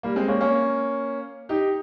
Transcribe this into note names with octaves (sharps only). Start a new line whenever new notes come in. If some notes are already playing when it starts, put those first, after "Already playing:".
G3 A#3
G#3 C4
A#3 C#4
A#3 C#4
D#4 G4